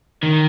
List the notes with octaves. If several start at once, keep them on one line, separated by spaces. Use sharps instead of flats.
D#3